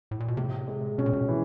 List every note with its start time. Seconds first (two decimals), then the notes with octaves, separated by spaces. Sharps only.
0.11 A2
0.20 A#2
0.28 B2
0.37 A2 C3
0.68 G#3
0.98 B2 C#4
1.06 A#2
1.13 B2
1.28 E3